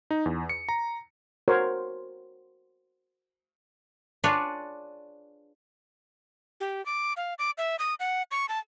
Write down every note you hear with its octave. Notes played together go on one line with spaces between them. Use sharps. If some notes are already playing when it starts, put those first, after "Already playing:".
D#4
E2
C#7
A#5
F#4 A#4 C5 C#5
D4 F4 G#4 B4 C#5 D5
G4
D6
F5
D6
E5
D#6
F#5
C#6
A5